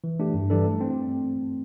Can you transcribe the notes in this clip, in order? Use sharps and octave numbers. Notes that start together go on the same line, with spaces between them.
E3
A3 D4 G4
G2
E3 G3 D4 A4
A3
C4